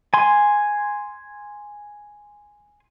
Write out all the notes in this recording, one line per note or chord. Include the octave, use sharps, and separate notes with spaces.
G#5 C6